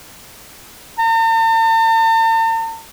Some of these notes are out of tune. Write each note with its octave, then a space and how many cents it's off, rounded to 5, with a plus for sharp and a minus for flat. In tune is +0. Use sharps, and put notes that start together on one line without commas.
A5 +45